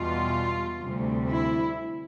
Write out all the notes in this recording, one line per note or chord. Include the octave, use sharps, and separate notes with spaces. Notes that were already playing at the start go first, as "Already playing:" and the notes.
Already playing: E2 B2 G3 F4
D2 C3 G3
E4